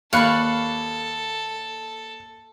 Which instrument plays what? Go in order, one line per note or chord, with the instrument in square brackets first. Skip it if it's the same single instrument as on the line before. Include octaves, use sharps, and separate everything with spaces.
[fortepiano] D#2 [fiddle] A4 [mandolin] D5 B5 F#6 [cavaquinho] F5 C#6